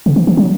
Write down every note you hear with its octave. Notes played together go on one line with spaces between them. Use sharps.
C#3
E3
E3
F#3